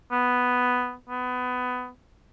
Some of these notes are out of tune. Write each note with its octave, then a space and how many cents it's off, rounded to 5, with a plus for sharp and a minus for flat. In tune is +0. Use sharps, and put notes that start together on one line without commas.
B3 +5
B3 +20